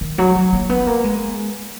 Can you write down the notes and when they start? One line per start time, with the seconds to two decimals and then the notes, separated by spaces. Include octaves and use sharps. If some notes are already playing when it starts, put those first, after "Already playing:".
0.01 D#3
0.18 F#3
0.36 F#3
0.53 A#3
0.69 B3
0.87 A#3
1.04 G#3